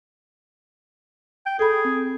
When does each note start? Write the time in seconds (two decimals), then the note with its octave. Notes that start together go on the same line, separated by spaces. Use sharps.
1.46 G5
1.59 G#4 A4 B5
1.85 C4